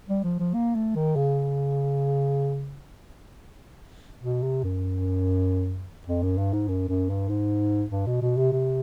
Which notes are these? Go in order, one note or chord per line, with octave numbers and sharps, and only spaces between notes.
G3
F3
F3
A#3
A3
D#3
C#3
B2
C3
F#2
F2
F#2
G2
G#2
F#2
F#2
G2
G#2
G2
B2
B2
C3
C3